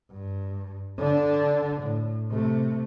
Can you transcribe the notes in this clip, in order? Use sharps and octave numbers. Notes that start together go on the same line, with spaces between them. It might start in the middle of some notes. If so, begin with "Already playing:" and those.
G2
D3 D4
A2
C3 A3